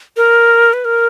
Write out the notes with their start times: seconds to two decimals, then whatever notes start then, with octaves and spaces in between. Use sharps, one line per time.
0.17 A#4
0.73 B4
0.85 A#4